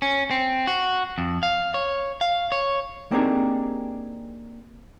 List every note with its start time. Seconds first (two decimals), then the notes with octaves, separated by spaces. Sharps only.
0.02 C#4
0.31 C4
0.67 F#4
1.18 F2
1.43 F5
1.74 C#5
2.21 F5
2.52 C#5
3.11 A#3 C4 D4 D#4 G4 G#4